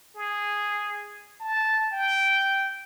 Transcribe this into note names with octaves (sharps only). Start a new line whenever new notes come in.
G#4
A5
G5